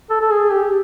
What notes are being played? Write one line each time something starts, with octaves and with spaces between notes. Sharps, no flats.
A4
A4
G#4
G4